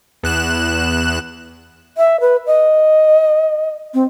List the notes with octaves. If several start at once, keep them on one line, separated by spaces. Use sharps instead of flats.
E2 F#6 E7
E5
B4
D#5
C4